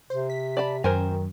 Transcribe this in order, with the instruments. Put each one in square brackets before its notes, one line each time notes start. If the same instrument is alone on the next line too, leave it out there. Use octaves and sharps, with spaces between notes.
[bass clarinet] C3 [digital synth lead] C5
[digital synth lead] B6
[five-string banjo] D5 A5 B5
[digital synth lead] F#2 [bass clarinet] D#3 [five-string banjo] A#4 C5 G#5